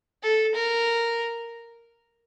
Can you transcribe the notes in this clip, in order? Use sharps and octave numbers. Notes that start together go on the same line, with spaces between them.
A4
A#4